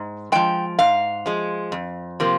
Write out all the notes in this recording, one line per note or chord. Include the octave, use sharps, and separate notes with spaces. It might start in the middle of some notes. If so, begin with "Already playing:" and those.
Already playing: G#2
F3 G#3 G5
G#2 F5
F3 G#3
F2
C3 F3 A#3